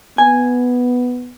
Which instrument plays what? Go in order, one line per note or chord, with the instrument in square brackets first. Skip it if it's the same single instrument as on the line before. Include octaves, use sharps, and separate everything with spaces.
[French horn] B3 [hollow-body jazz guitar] G#5